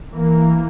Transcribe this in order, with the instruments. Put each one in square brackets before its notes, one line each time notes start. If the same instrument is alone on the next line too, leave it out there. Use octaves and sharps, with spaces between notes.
[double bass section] E3 A#3